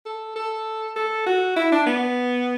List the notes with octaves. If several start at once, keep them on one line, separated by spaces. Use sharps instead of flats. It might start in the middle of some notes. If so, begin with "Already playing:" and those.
A4
A4
A4
F#4
E4
D4
B3